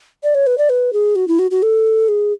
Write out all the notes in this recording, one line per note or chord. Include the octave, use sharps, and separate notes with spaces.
D5
C#5
B4
D5
B4
G#4
F#4
E4
F#4
F#4
A4
G#4